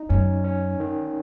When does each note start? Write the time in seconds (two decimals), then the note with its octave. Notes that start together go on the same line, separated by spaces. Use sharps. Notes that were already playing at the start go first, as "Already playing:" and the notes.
Already playing: D#4
0.09 F#2 C#4
0.44 C#4
0.80 D#3